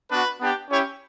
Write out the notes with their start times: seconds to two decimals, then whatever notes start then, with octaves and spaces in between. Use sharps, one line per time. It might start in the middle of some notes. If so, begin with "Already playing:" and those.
0.10 B3 D4 F#4 B4
0.40 B3 D4 G4
0.70 C#4 E4 G4 C#5